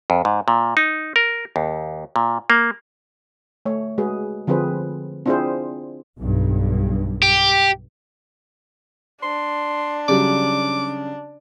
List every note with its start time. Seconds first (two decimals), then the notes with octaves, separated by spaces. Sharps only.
0.10 F2
0.25 G#2
0.48 A#2
0.77 D#4
1.16 A#4
1.56 D#2
2.16 A#2
2.50 A#3
3.66 A3 C#5
3.98 G#3 F#4 G#4 B4
4.47 D3 F3 C4 G#4 B4 C5
5.26 C4 D4 E4 F4 G#4 C5
6.19 B1 G2
7.22 G4
9.22 D4 C6
10.08 C#3 F#3 G3 D6